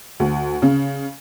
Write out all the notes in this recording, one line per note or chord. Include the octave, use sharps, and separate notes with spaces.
D2
C#3